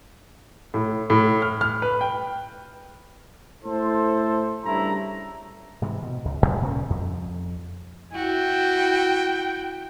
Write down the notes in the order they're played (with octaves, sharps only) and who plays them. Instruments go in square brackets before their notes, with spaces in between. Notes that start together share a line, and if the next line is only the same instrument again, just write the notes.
[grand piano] A2
A2
F6
F6
B4
G5
[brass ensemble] A2 E4 A4 C5
G2 C#3 A3 E4 A#5
[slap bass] G#2 C3 E3
B2
C#2
D1 G#1
A#2 C#3 C#4
F2
[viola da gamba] E4 F#4 [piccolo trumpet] G5